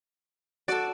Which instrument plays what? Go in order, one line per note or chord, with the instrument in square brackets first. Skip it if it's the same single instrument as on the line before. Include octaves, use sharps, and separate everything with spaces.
[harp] F#4 A4 [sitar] D5